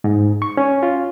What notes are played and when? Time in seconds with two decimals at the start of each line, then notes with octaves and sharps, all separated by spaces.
0.04 G#2
0.42 C#6
0.57 C#4
0.83 F4